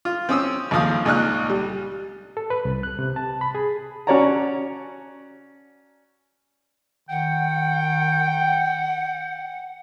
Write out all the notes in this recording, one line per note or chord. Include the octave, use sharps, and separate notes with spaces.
F4
C4 C#4 D#6 E6
G#1 D#2 F3 F5 D#6
C#2 A#2 D#4 F6 F#6
G3
A4
B4
C2
F#6
C3
A5
B5
G#4
C#4 F#4 C#5 D5 A5 A#5
D#3 F#5 G5